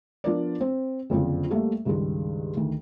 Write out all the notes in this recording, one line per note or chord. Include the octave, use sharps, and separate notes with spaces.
F3 B3 D4 F4 A#4 D5
C4
F#1 F2 D3 F3
G3 A3 A#3 A4 E5
C#2 G2 D#3 G#3
D2 D#3